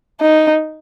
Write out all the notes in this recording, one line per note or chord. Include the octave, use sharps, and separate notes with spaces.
D#4